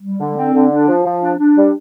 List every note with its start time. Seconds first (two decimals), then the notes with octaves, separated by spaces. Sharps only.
0.03 G3
0.19 D3
0.37 C4
0.54 D3
0.71 D4
0.88 F3
1.05 F3
1.22 D4
1.39 D4
1.56 G3